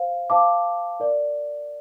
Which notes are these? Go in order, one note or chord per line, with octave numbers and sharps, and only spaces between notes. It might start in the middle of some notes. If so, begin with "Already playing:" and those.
Already playing: C5 F5
C5 F5 A5 D6
A#4 D5